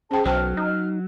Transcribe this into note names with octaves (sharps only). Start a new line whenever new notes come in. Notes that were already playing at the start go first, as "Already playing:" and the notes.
C#4 G#4 C5 G5 A5
B1 F#3 C5 G5 A5 F6
D#4